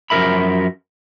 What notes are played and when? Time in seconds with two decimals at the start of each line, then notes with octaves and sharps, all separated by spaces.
0.10 F#2 F3 A4 A#4 E5 B5